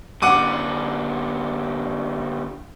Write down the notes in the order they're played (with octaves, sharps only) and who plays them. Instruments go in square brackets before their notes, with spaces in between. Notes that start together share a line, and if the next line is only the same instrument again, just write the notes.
[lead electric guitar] F#2 D3 [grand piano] F#5 D6 D#7